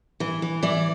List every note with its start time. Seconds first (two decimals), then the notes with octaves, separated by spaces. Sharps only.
0.20 E3
0.42 E3
0.63 E3 D5